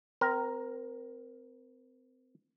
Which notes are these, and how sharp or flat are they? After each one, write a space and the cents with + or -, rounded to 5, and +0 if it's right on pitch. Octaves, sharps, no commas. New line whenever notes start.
C4 -25 A#4 +5